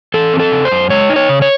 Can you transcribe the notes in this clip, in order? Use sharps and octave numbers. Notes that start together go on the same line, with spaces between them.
E3 A4
C4
A4
C#3
C5
F#2
G#3 C#5
D#4
C#5
C#3
C#5